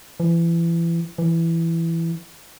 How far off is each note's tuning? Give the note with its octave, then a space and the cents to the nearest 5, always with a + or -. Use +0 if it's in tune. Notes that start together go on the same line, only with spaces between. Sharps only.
E3 +30
E3 +10